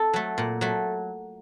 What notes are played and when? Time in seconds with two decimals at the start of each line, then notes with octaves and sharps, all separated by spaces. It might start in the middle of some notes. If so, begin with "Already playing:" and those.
Already playing: A4
0.13 F#3 A3
0.38 A#2
0.61 F#3 A3